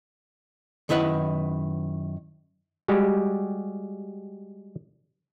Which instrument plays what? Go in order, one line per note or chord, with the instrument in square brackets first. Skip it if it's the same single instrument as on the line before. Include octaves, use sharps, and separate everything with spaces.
[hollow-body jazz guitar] F#2 D#3 E4 B4 F#5
[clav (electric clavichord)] G3 G#3 F#4 G4